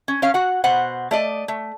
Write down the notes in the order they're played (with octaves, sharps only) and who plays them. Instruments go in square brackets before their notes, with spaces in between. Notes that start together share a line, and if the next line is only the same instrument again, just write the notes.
[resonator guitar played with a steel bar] C#4
C#4 C#5 F5
F#4 F#5
B2 C5 F#5
A3 D5 D#5
A3